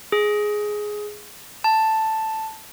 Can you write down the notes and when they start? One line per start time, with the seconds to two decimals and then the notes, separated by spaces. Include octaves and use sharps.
0.12 G#4
1.64 A5